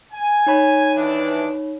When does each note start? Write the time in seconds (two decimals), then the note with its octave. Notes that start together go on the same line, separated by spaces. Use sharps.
0.12 G#5
0.47 D#4 C#5 B5
0.95 D#2 E3 D4